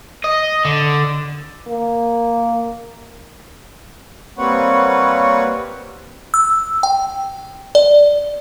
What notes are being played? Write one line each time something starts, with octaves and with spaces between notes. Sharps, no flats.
D#5
D3
A#3
G3 A#3 C4 B4 C#5 F#5
E6
G5
D5